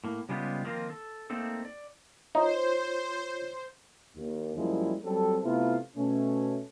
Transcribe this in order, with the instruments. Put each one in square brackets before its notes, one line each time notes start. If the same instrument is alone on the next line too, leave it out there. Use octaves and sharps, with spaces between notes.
[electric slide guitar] A2 A#3
C#3 G3 G#3 B3 F4 G4
D#3 F3 A#3 C4 F4 A#4
A4
A3 A#3 C4 D#4 A4
D5
[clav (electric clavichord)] D#4 [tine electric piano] F4 C#5 [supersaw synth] C5
[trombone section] D#2
F#2 F3 G3 G#3 A#3 E4
F#3 G3 C4 A4
C3 A3 B3 E4 F4
B2 A3 C#4